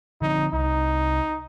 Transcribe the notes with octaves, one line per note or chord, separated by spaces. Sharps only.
D3 F3 C4 D#4
C2 D#4